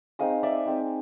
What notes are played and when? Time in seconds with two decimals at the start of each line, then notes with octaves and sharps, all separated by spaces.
0.19 G#3 C4 D#4 D#5 F5
0.43 D5 E5
0.66 G#3 C4 D#4